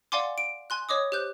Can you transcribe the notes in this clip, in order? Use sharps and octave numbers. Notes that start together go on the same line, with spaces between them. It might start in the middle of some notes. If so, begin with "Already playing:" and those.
D5 F5 F#5 G#5 C6 D6
D7
G#5 C6 F#6
C#5 D#5 D6 D#6
G4 C5 F#6 G6